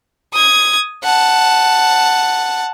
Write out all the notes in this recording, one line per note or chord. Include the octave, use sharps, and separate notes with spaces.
D#6 G#6
F#5 A5